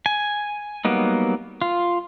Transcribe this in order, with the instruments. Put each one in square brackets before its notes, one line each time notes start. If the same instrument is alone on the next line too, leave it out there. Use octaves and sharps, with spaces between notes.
[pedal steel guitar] G#5
F#3 G3 A#3 B3 D#4
F4